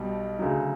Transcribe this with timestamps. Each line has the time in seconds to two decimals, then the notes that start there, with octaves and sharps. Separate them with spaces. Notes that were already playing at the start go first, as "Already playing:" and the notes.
Already playing: B1 B2 G3
0.39 D2 C#3 F#3